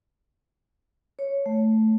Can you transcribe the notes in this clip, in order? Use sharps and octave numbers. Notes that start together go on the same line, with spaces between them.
C#5
A3